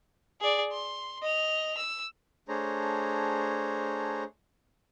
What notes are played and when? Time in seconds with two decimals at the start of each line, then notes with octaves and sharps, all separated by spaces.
0.41 G#4 D5
0.72 C6
1.23 D#5 F7
1.77 E6
2.48 A3 D4 G#4 C5 C#5 A#5